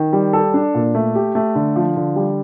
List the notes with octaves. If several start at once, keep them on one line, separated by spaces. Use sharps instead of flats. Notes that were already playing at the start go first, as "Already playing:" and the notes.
Already playing: D#3
G3
A4
D4
A#2
A3
G4
A3
D3
F3
D3
G3